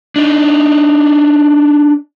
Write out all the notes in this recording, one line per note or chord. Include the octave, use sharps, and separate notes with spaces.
D4 D#4